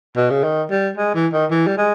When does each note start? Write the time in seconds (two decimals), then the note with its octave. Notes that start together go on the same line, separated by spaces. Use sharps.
0.16 B2
0.30 C#3
0.43 D#3
0.70 G3
0.97 G#3
1.15 E3
1.33 D#3
1.51 E3
1.67 G3
1.78 G#3